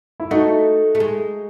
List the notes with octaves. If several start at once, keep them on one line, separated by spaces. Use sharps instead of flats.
E4
A3 D#4 F#4
A3
G#3